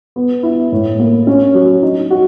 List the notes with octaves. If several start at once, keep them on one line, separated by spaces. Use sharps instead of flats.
B3
E4
A2
A#3
C#4
F#3
D#4
F#4